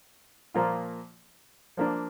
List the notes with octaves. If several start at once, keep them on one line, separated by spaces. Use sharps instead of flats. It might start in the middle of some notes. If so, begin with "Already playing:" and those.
A#2 F3 A#3 F4
F3 A#3 D4